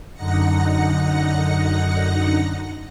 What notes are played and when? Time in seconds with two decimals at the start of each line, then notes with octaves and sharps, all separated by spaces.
0.14 F#2 D3 D#4 F#5 A#6 C#7